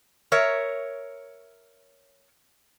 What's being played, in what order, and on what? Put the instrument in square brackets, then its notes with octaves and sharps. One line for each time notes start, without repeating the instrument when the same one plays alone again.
[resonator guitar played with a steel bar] A#4 C#5 E5